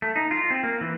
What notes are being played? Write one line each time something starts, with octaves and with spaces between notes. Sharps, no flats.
A3
D#4
F4
C4
A#3
E3